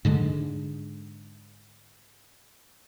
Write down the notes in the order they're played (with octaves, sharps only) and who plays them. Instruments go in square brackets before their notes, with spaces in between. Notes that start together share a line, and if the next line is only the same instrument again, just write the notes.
[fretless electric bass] G#2 D3 G#3